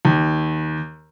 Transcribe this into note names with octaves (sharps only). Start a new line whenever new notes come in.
D#2